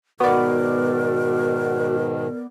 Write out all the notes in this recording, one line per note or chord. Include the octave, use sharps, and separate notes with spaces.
G#2 B2 D#3 B3 F#4 A#4 D5